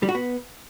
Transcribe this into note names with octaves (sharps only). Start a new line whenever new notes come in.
G3
F#4
B3